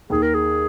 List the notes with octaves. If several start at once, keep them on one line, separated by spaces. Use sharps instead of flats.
D#2 D#3 G#4
A#4
G#4